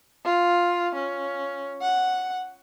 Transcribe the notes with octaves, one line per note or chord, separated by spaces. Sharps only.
F4
C#4
F#5